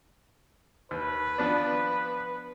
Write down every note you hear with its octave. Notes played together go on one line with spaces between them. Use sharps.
D#2 B4
F3 B3 D4